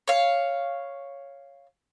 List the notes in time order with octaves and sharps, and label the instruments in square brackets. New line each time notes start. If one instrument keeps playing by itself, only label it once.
[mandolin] C#5 F5